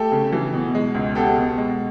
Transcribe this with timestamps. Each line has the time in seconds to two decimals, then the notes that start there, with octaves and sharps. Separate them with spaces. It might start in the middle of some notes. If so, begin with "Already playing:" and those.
Already playing: A3 G4 A4
0.12 C#3
0.33 E3
0.53 B2
0.75 G#3
0.94 C#2
1.15 B3 G4 A4
1.37 B2
1.58 G#3